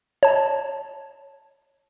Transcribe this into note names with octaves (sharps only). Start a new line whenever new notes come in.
C#5 A5